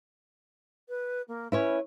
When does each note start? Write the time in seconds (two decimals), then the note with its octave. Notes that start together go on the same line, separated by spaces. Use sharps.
0.88 B4
1.28 A#3
1.52 C#4 E4 B4 C#5